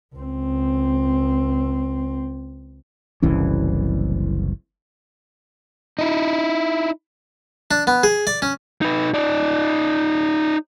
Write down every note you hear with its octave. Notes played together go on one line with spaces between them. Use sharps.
C#2 C4
F#1 C2 E3 C#4
D#4 E4
D4
B3
G#4
D5
C#4
D#4 B4
D#4 D5